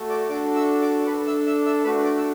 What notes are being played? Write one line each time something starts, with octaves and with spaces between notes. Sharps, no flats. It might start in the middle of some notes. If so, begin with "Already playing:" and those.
Already playing: A3 F#4 A4
D5 D6
D4 F#4 A4 D5 D6
E5 E6
D5 D6
D4 A4 B4 B5
E5 E6
E5 E6
E5 E6
A3 D4 F#4 B4 B5
D5 D6
E6